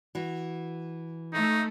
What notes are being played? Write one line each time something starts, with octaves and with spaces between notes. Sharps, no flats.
E3 F#4
A3 D#4